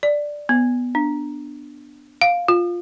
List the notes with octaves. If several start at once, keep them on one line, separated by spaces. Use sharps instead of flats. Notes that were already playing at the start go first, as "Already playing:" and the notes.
D5
B3
D4
F5
F4